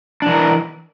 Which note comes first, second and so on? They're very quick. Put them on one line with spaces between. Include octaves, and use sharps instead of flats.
D4 E3 A#4